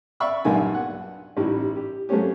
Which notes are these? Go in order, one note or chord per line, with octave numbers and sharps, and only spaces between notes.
D5 E5 F5 B5 C#6
B1 G2 A#2 D#4 G#5
F#5
A1 G3 D#4 E4
G4
F#3 A3 A#3 C4 C#4 G4